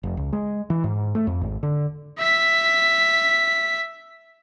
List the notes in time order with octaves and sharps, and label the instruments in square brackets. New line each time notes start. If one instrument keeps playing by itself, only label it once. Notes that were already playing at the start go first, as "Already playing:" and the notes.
[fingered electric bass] F1
C#2
G#3
E3
G#2
A3
F2
G#1
D3
[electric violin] E5 B6